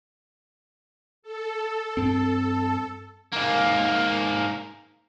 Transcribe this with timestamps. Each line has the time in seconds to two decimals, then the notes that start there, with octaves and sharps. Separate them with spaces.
1.22 A4
1.97 G2 C4
3.32 G#2 A#3